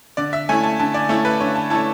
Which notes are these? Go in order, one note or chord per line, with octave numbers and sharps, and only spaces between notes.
D3 D5
E5
A3 C#4 E4 G#5
A5
D3 A5
D5
A3 C#4 E4
B4
D3 C#5
A5
A3 C#4 E4 A5